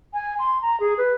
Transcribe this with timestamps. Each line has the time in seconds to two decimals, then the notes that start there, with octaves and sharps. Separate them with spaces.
0.13 G#5
0.39 C6
0.62 A#5
0.80 G#4
0.98 B4